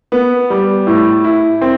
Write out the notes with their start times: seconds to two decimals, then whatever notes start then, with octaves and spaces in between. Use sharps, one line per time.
0.12 B3
0.50 G3
0.87 A2
1.24 E4
1.61 C4